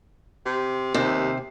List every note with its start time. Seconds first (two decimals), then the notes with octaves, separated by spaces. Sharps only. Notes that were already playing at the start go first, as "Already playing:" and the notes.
0.46 C3
0.94 D#2 C3